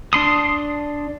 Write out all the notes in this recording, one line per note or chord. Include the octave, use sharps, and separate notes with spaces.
D4 C6 D#6